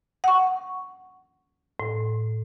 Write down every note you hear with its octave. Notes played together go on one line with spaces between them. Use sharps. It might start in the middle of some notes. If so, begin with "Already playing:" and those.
F#5 C#6
A2